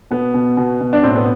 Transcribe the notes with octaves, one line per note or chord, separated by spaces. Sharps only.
B2 B3
B2
B2
B2
D4
A2 C4
B3